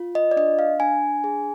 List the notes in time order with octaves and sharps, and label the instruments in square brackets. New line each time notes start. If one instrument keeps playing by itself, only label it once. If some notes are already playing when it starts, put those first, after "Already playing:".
Already playing: [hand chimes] F4
D#5
D5
D4 D#5
F5
D4 G#5
G#4